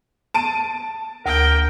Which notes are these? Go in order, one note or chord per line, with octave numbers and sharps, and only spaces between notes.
A5 D7 D#7
D2 A#3 A#4 G5